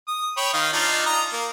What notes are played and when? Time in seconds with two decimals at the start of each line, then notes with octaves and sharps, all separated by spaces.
0.08 D#6
0.37 C#5 G5 B5
0.54 D#3 D#5 F5
0.73 D4 D#4 F4
1.06 A#5 D#6
1.33 A#3